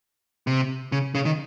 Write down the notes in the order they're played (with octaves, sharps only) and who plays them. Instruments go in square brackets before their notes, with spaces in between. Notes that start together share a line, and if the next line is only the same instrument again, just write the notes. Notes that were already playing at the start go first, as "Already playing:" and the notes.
[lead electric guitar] C3
C#3
C#3
D#3